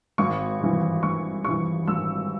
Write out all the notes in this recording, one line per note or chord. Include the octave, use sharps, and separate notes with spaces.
G#1 C#6
G2 E3
G#1 C#6
G2 E3 C#6
G#1 E6